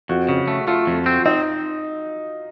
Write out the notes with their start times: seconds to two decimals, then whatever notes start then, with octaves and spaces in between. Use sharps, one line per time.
0.09 F2 F#4
0.29 C#3
0.48 A3
0.67 A3 F4
0.87 F2
1.06 C4
1.26 C4 D#4